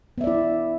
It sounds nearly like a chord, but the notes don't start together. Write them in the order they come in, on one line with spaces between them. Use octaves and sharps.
B3 E5 D5 E4